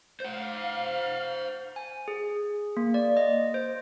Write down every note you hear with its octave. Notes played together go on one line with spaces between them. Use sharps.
C5 F5 F#5
G#5
G#4
A#3
D5
D#5
C5